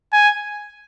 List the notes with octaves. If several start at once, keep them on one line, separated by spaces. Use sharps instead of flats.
G#5